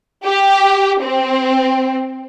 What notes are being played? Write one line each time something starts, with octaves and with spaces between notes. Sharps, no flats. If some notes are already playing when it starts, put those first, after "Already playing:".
G4
C4